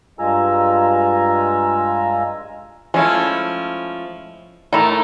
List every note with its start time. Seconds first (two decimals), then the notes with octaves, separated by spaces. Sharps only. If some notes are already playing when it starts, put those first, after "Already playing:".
0.19 G2 G#3 F4 G#5 A#5 E6
2.94 F3 G#3 A3 C#4 E4
4.73 A2 A3 D#4 E4 A#4